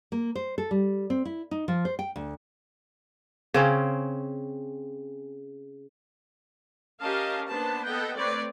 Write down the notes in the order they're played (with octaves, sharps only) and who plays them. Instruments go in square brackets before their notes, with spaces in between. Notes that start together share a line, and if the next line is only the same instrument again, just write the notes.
[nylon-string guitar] A#3
C5
A4
G3
C4
E4
D#4
F3
C5
G5
D2
[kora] C#3 C4 C#4
[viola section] C#4 G4 A#4 D#5 F5 A5
A#3 B3 D4 B4 C5 A5
B3 A4 D#5 F#5 G5
A3 C4 B4 C#5 D5